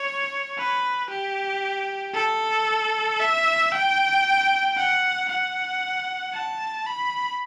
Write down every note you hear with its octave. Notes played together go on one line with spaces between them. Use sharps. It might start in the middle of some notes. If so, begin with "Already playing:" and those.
Already playing: C#5
B4
G4
A4
E5
G5
F#5
F#5
A5
B5